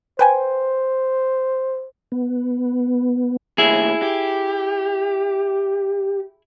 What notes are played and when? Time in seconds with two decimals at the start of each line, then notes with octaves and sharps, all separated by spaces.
0.19 B4 C5 G5 G#5
2.12 B3
3.58 D#2 A2 E4 G#4
4.02 G4